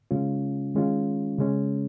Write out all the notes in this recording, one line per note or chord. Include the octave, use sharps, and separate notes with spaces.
C#3 G#3 C#4 F4
D#3 G#3 C#4 F4
C#3 G#3 C#4